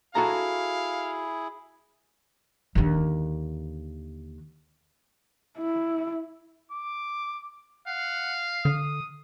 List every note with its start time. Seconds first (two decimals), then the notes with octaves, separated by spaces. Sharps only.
0.15 E4 F#4 G#4 A4 F5 A#5
2.75 D#2 D3
5.58 E4
6.72 D6
7.88 F5 F#5
8.65 D3 D#6